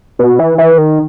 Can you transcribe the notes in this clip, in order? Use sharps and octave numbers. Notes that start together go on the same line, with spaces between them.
B2
E3
E3
D#3